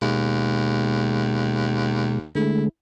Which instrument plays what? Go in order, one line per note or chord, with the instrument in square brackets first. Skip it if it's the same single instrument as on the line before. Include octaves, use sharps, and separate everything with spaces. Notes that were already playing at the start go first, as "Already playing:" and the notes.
[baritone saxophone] D#2 [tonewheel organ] B2 G#3
[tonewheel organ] D3 G#3 A3 [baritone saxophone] E4